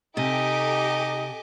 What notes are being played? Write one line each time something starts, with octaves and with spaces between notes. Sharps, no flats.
C3 D#4 G4 A4 D#5 G#5 D6